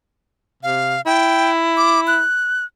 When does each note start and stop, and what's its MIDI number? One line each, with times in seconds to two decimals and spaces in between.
0.63 0.97 48
0.63 1.01 77
1.06 2.23 64
1.06 1.51 79
1.77 2.00 86
2.07 2.65 90